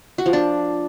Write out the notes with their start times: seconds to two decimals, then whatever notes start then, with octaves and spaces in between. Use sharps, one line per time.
0.18 F#4
0.26 F3
0.33 D4